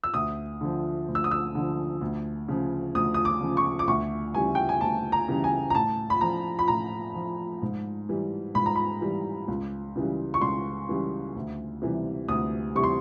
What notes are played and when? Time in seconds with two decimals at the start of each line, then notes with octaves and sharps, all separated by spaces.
0.04 E6
0.14 D2 D#6
0.61 D3 F3
1.08 D2
1.15 E6
1.24 D#6
1.31 E6
1.55 D3 F3
2.01 D2
2.48 C#3 F3
2.95 D2 D#6
3.14 D#6
3.25 D6
3.41 C#3 F3
3.57 C#6
3.79 D6
3.87 D2 C#6
4.34 C#3 E3 G3 G#5
4.55 G5
4.69 G#5
4.81 D2 A5
5.12 A#5
5.28 C#3 E3 G3
5.44 G#5
5.70 A#5
5.75 A2 A5
6.10 B5
6.21 F3 A#5
6.59 B5
6.68 A2 A#5
7.14 F3
7.62 G#2
8.09 E3 G3
8.55 G#2 B5
8.66 A#5
8.76 B5
9.01 E3 G3
9.48 C#2
9.96 C#3 E3 G3
10.34 C#6
10.41 C#2 C6
10.89 C#3 E3 G3
11.36 D2
11.82 C3 E3 G3
12.29 D2 D#6
12.75 C3 E3 G3 C#6
12.83 C6